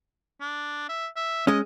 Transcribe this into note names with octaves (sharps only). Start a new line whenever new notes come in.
D4
E5
E5
G#3 C#4 D#5